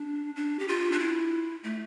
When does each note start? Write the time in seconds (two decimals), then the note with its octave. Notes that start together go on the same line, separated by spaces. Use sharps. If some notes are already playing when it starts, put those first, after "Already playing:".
Already playing: D4
0.36 D4
0.59 G4
0.68 F4
0.92 D4
0.99 E4
1.64 A3